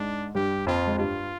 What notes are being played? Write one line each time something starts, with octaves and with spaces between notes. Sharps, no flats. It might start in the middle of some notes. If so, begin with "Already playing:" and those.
Already playing: G#2 G#3 D4
G2 G3 G4
F2 F3 F4
G#3
G2 G3 F4